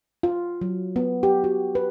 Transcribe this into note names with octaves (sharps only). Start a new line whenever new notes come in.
F4
F#3
B3
G4
F#4
B4